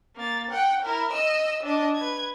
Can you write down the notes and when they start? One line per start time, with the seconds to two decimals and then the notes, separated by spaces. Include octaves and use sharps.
0.15 A#3 A6
0.51 F#5 G5
0.82 E4 A#4
1.13 D#5 E6
1.63 D4 D#5
1.95 B4 G#6